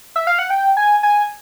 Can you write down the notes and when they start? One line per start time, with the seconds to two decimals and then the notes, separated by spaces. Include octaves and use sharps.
0.16 E5
0.27 F5
0.39 F#5
0.50 G5
0.77 G#5
1.03 G#5